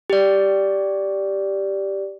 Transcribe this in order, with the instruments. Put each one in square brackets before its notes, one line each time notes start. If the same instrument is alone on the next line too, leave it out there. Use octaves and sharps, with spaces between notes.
[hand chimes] G4 D5